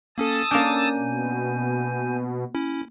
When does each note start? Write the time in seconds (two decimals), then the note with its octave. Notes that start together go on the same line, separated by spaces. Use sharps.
0.18 A#3 C#4 A4 A5 D#6 E6
0.51 A#3 C#4 D4 G#5 G6
0.97 B2
2.55 C#4 E4